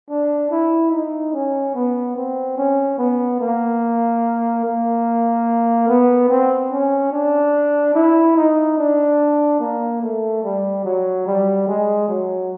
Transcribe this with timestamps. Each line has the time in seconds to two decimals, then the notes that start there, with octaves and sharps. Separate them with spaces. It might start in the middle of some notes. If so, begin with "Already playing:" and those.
0.10 D4
0.51 E4
0.91 D#4
1.33 C#4
1.74 B3
2.16 C4
2.57 C#4
2.98 B3
3.40 A#3
4.64 A#3
5.88 B3
6.29 C4
6.71 C#4
7.12 D4
7.94 E4
8.36 D#4
8.78 D4
9.60 A#3
10.02 A3
10.43 G3
10.85 F#3
11.26 G3
11.67 G#3
12.08 F#3